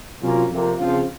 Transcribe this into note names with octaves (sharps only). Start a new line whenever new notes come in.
C3 F#3 A#3 C#4 F4
F2 C3 F3 A#3
C#3 F3 C4 F4